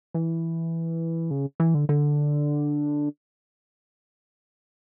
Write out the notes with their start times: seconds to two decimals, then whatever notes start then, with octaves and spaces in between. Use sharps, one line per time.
0.14 E3
1.31 C#3
1.60 E3
1.74 D3
1.89 D3